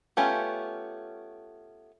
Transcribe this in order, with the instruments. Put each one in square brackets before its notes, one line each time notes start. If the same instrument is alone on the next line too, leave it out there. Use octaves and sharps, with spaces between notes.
[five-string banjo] A3 B3 C#4 F4 G4